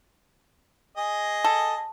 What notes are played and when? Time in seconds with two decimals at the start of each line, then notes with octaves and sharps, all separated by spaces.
0.97 G#4 D#5
1.44 A4